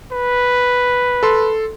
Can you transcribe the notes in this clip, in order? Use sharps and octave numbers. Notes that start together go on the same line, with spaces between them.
B4
A4 C6